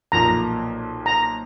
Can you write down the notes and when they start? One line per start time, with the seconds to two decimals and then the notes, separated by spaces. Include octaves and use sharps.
0.12 B1 A#2 F3 A#3 A#5
1.06 A#5